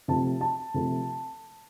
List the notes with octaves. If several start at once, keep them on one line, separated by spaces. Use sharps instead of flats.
C3 F3 A3 A5
A5
C3 F3 A3